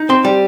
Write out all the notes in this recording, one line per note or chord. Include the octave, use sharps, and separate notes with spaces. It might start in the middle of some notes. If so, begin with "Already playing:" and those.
Already playing: D#4
C4 C6
G3